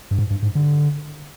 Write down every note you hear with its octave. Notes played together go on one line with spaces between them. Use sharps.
G2
G#2
G2
G#2
D3